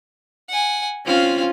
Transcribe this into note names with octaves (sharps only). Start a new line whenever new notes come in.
F#5 G#5
C4 C#4 F4 F5